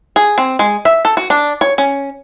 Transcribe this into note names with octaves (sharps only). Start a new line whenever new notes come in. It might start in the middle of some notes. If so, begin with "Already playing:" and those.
G#4
C4
G#3
E5
A4
F#4
D4
C#5
C#4